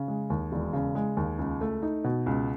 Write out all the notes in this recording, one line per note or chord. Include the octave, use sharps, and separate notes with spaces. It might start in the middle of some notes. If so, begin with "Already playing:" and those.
Already playing: C#3
G#3
D#2
E1
C#3
G#3
D#2
C#2
A3
D#4
B2
C#2